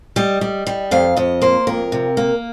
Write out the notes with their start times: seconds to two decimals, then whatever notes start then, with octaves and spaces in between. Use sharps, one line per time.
0.16 G3 D#5
0.41 G3
0.67 G3
0.91 F2 F5
1.16 F2 D#5
1.42 A#3 C5
1.67 F2 A#4
1.92 C3
2.17 A#3